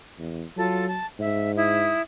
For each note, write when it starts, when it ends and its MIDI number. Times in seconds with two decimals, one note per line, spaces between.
0.19 0.44 40
0.57 0.99 54
0.57 0.84 65
0.57 0.84 69
0.57 0.84 81
0.88 1.07 81
1.19 1.97 44
1.19 1.52 76
1.57 2.02 64
1.57 2.02 87